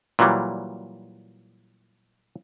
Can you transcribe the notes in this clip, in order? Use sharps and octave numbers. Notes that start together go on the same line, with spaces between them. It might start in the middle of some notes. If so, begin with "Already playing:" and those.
A#2 E3 F#3 G3